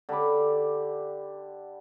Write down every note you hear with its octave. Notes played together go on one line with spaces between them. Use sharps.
D3 G4 B5 D6